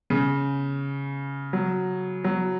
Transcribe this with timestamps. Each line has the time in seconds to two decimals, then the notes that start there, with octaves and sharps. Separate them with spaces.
0.10 C#3
1.53 F#3
2.24 F#3